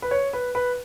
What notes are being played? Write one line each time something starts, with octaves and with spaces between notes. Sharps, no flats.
B4
C#5
B4
B4